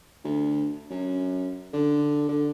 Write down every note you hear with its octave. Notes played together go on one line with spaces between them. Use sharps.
D2
F#2
D3
D3